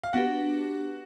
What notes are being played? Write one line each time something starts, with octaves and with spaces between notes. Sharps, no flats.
F5
B3 D4 F#4 G4 B4 F#5